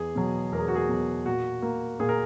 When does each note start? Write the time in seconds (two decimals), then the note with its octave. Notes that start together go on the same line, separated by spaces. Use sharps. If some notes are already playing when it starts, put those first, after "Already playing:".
Already playing: E2 G#4
0.15 B2 F#3
0.52 E2 A#4
0.60 G#4
0.68 F#4
0.75 G#4
0.89 B2 F#3
1.26 A#2 F#4
1.62 A#3
2.00 A#2 G#4
2.09 A#4